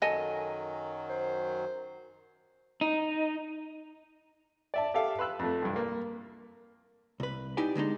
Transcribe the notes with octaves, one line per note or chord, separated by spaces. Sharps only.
F#2 D#3 F#3 A4 D#5 G#5
C5
D#4
D5 E5 A5
G4 A4 E5 F5
B4 C6 E6 F#6
F2 A3
C2 G2
A#3
C2 B4
D#4 E4 G4 D5 G#5
D3 G#3 D4 D#4